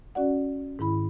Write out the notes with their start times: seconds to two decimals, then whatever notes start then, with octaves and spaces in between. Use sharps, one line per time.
0.15 C#4 F#4 D5 F#5
0.79 G#2 D#3 E4 B5